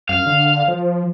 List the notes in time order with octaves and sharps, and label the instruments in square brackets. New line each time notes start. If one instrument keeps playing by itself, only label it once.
[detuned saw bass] F#2 [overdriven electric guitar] F5
[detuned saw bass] D3
D3
F3